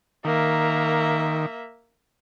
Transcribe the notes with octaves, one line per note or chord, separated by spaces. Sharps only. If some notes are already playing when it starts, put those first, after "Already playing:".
D#3 A#3 E5